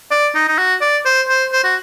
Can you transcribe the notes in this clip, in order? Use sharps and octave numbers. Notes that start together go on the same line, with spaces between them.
D5
D#4
D#4
F#4
D5
C5
C5
C5
F#4